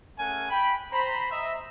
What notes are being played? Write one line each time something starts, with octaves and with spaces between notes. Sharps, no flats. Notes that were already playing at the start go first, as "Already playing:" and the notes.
A3 C#4 G#4 A#4 F#5 G#5
G5 B5
C5 A#5 B5
D#5 E5 A#5